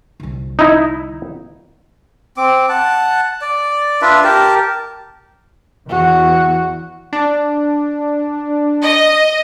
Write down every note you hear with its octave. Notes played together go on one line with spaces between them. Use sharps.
C2 D3
D#4 E4
C4 D6
F#5 A5
D5
D4 F4 B4 E5
G4 A#4 A5
E2 F#4
D4
D#5